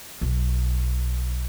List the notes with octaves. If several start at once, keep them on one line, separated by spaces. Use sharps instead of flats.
B1